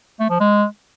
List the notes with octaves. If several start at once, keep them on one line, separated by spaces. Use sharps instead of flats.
A3
F3
G#3